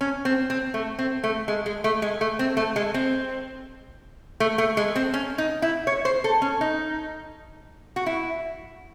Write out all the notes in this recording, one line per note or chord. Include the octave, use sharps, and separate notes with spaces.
C#4
C4
C4
A3
C4
A3
G#3
G#3
A3
G#3
A3
C4
A3
G#3
C4
A3
A3
G#3
C4
C#4
D#4
E4
C#5
C5
A4
C#4
D#4
F#4
E4